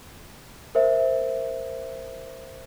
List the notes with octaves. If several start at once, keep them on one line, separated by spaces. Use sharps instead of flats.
A#4 C5 E5